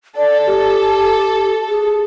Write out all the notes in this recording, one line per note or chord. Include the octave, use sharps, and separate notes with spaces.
A4 D5
G4
G#4